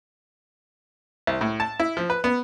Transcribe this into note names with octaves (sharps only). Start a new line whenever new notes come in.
C2
A2
A5
E4
F3
B4
B3